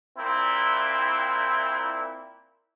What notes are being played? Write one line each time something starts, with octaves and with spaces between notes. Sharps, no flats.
A#2 C4 E4